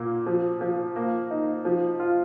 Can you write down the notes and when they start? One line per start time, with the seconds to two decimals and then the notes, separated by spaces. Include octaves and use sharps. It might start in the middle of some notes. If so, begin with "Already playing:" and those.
Already playing: A#2 A#3
0.26 F3
0.61 F3
0.96 A#3
1.31 D#4
1.65 F3
2.00 F4